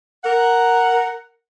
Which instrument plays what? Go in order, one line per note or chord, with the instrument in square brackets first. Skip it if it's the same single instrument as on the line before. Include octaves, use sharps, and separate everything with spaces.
[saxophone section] A#4 F#5